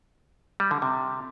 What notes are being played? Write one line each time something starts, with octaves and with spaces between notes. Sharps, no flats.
G3
D3
C3